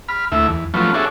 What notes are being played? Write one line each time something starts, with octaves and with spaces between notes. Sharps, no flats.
B5 F6
D2 A3 E4 E5
E2
F3 F#3 A3 B3 C#4 F4
D4 F#4 G#4 A4 C#5 E5